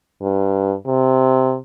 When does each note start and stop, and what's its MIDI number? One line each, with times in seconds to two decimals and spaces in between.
0.22 0.74 43
0.87 1.57 48